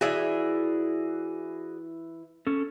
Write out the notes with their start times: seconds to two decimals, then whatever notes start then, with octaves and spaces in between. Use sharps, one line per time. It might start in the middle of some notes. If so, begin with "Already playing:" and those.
0.01 E3 F#4 G#4 D5 E5 G#5
2.47 C#4 A4